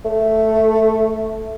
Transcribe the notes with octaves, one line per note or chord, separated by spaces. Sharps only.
A3